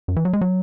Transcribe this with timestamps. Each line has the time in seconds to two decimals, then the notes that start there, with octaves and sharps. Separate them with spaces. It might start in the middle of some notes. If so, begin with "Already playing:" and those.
0.08 F#2
0.16 E3
0.25 F#3
0.33 G#3
0.41 F#3